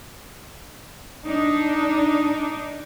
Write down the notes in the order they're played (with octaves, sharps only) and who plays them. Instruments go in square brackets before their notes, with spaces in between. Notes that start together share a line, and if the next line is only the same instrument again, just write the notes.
[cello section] D4 D#4